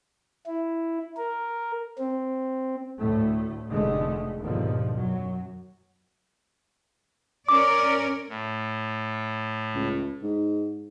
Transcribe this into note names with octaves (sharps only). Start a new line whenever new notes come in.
E4
A#4
C4
D2 A2 A3
F1 D3 G#3 A3
D#2 G#2 B2 D3 F3
F#2 F#3
C#4 A#4 D5 D6
A2
C#2
G#2